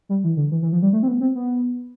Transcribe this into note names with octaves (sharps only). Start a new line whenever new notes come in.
G3
E3
D3
E3
E3
F3
G3
A3
C4
B3
C4
B3